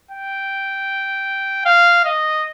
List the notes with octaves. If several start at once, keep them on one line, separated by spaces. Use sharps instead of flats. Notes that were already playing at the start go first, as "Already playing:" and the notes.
G5
F5
D#5